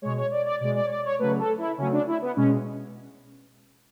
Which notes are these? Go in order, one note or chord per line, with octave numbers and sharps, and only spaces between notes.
B2 G#3 C#5
C#5
D5
D5
B2 G#3 D5
D5
C#5
D5
C#5
C#3 F#3 A3 B4
A4
E4
C#3 F#3 A3 C#4
D4
E4
B3
B2 G#3 C#4